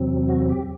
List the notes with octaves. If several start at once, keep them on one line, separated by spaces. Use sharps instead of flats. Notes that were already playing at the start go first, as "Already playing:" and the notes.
Already playing: E2 C3 F#3 C4
F#4
G4